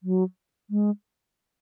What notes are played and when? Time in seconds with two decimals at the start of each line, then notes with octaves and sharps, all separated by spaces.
0.03 F#3
0.70 G#3